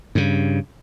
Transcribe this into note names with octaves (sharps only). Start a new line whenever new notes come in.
G2 C#3